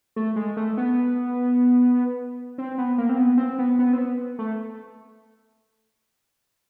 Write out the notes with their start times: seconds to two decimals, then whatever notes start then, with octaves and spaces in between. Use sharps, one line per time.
0.16 A3
0.36 G#3
0.57 A3
0.77 B3
2.58 C4
2.78 B3
2.98 A#3
3.09 C4
3.18 B3
3.38 C4
3.59 B3
3.79 B3
3.93 C4
3.98 B3
4.39 A3